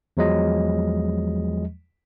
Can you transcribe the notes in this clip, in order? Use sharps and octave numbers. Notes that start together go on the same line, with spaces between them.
E2 F3 F#3 G#3 D#5